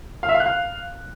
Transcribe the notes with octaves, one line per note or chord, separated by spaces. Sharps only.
F5
E5
F5
F#6
F5